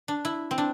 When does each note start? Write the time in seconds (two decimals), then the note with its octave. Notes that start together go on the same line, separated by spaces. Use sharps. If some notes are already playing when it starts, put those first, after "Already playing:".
0.08 D4
0.25 E4
0.51 C4
0.58 D4